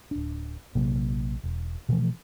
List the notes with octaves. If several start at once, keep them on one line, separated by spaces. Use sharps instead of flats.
D1 D4
A#1 C3 F#3 A#3
E1
B2 E3 F3 A3